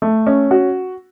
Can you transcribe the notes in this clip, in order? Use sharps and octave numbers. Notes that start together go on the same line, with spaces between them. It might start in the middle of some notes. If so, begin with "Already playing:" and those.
A3
C#4
F#4